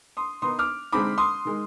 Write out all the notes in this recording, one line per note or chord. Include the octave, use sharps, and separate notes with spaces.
C6 D#6
D#3 B3 D#4 C6 D#6
D6 F6
D3 G#3 C4 D#4 B5 D6
C6 D#6
D#3 G#3